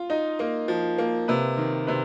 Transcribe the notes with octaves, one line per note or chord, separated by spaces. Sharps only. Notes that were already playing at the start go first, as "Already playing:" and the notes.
Already playing: F4
D#4 D#5
A#3 D#5
F3
A#3
C3 B4
D#3
C3 B4